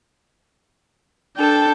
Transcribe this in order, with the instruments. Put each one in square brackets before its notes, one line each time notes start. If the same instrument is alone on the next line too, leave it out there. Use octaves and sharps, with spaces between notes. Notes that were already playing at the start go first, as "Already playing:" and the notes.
[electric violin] D4 G5 [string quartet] A4 A5